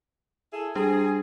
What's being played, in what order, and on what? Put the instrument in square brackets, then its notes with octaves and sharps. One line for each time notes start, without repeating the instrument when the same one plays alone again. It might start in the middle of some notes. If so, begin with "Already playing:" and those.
[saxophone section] E4 G#4 A4
[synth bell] G3 D4 G4 [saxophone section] G#4